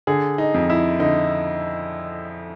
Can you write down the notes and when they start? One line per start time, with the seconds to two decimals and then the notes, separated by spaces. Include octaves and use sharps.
0.07 D3 G#4
0.38 D#4
0.54 F2
0.70 E4
1.00 D3 D#4